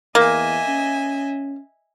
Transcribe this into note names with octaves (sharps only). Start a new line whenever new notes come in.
E2 A#3 D#5 E5 G#5
C#4